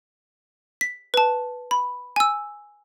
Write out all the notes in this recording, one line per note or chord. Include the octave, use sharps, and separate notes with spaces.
B6
B4 A5
B5
G#5 E6